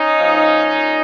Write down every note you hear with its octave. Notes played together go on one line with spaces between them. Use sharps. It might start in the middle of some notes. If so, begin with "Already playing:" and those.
Already playing: C#4 D#4
A#2 F3
A#2